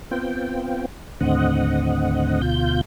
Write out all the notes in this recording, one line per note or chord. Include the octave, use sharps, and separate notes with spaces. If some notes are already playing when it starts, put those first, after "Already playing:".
B3 C4 F4 G5
D#2 A2 D3 C4 D#5 F#5
D2 B2 F4 G6